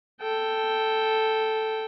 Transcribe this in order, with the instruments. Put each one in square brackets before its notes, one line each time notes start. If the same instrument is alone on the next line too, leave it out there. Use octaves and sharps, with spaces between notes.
[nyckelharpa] A4 G5